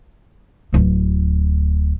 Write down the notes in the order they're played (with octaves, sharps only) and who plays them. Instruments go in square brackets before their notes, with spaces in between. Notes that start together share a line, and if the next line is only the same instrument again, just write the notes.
[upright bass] D1 D2